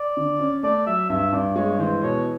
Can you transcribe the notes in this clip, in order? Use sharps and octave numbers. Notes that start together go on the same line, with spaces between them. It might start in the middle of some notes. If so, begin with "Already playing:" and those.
Already playing: D5
D3
C#4
A3 D5
F#3 E5
G2 E5
G2 D5
G#3 C#5
E3 C5
B2 C#5